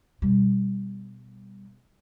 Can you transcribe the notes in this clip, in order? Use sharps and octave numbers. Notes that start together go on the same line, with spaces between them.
B2 G3